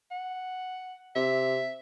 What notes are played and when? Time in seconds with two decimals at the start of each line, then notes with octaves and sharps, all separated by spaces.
0.11 F#5
1.15 C3 E5